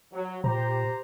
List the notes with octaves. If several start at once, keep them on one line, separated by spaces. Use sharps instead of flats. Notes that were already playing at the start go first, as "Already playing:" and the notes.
F#3
A#2 G4 C5 A#5